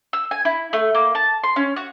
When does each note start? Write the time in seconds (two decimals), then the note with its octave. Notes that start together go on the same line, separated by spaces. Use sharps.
0.13 E6
0.31 G#5
0.45 E4
0.73 A3
0.95 A#3
1.15 A5
1.44 C6
1.56 C#4
1.76 F#4